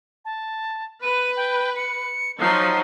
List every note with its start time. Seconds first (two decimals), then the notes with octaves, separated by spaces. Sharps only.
0.25 A5
1.03 B4 D#7
1.37 G5
1.76 C#7
2.41 F3 F#3 D#4 C7